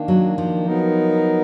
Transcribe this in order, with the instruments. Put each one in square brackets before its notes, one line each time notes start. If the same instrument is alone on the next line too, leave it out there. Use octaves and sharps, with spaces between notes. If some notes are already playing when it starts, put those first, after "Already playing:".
Already playing: [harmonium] D#3 A#3 D4
[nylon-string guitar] F#3
F3
[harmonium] F#3 B3 D#4 A#4